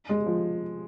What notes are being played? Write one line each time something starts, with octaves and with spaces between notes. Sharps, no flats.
G#3
F3